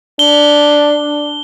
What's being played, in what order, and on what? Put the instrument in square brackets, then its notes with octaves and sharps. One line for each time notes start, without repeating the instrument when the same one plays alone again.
[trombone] D4 [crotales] G7